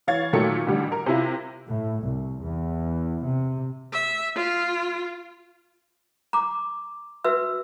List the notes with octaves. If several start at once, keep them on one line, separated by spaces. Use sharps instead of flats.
E3 C#5 F5 G#6 A6
A#2 D#3 F#3 A3 A4 C#7
A1 D3 G3
A#4
C3 E4 F4
A2
C2
E2
C3
E5
F4
A#5 D6
F#4 B4 E5 E6